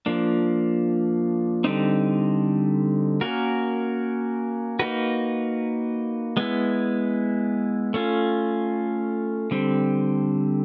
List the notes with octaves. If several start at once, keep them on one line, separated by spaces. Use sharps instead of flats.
F3 A#3 D4
D3 G3 C4 D#4
A#3 C#4 F#4 A#4
A#3 D#4 F#4 B4
G#3 B3 E4
A3 C#4 F4
D3 G3 C4